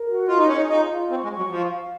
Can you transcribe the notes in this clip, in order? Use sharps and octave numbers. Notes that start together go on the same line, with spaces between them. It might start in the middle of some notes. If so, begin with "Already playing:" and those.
Already playing: A#4
F#4
F4 D#5
D#4
C#4 G#4
D#4
D#4 F4
F4
C4 C#6
G#3
C#6
F#3
F3 F5
F5